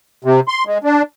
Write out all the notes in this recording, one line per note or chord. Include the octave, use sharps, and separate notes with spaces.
C3
C6
G#3
D4